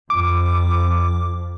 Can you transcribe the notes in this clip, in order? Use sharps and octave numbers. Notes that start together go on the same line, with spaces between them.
F2 D6